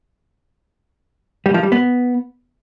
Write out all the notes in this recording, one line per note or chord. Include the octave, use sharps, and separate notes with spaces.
G3
F3
G3
B3